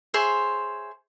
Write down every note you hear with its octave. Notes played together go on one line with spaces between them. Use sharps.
G#4 C5 C#5 E5